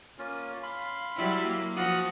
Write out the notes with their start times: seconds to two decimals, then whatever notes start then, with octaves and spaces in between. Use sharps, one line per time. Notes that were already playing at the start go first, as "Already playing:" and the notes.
0.18 A#3 C#4 F4
0.63 F5 B5 C6
1.16 F#3 G3 E4
1.46 A#3
1.76 F3 F4 F#4 F#5 D#6